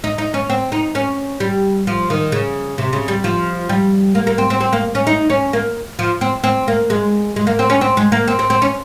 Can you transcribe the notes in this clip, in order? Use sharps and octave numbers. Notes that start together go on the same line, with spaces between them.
D#4
D#4
C#4
C4
D#4
C#4
G3
F3
D#3
C#3
C3
C#3
G3
F3
G3
A#3
A#3
C4
C4
C4
A#3
C#4
D#4
C#4
A#3
F3
C4
C4
A#3
G#3
G#3
A#3
C4
C#4
C4
G#3
A#3
C4
C4
C4
C#4